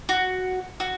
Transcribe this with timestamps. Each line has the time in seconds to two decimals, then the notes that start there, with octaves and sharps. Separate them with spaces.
0.09 F#4
0.80 F#4